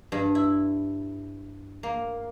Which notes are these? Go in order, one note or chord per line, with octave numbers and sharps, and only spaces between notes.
G2
E4
A#3